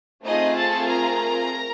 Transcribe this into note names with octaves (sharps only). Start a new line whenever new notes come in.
A3 C4 D#4 F4 G#4 D#5
A4 A5
A#4 A#5